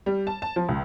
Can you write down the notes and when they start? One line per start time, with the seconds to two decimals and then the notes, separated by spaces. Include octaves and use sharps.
0.06 G3
0.27 A5
0.42 A5
0.56 F3
0.69 C#2